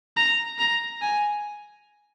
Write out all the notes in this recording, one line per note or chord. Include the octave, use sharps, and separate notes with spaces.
A#5
A#5
G#5